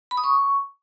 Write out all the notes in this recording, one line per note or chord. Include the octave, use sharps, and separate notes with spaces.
B5
D#6
C#6